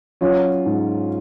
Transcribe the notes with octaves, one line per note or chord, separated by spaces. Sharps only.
F#3 C#4 F4
G#2